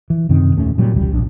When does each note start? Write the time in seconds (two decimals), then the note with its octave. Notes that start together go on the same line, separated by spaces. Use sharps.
0.10 E3
0.29 F#2 C3 D#3 C4
0.56 D#1 D#2 A3 C#4
0.78 A#2 F#3 G3
0.94 E1 C#2 G3
1.12 A#1 D4